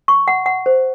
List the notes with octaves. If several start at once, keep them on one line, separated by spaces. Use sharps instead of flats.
C#6
F#5
F#5
C5